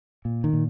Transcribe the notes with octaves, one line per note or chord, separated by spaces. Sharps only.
A#2
D#3
A#2